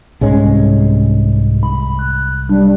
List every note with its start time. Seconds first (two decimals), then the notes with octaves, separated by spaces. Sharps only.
0.21 C2 G#2 G#3 C#4
1.63 B5
1.99 F#6
2.49 G3 D4